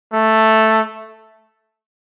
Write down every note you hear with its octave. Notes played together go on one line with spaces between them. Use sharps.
A3